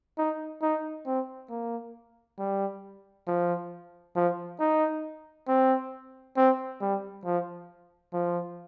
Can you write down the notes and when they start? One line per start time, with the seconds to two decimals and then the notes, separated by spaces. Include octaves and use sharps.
0.18 D#4
0.62 D#4
1.06 C4
1.50 A#3
2.39 G3
3.27 F3
4.16 F3
4.60 D#4
5.48 C4
6.37 C4
6.81 G3
7.25 F3
8.13 F3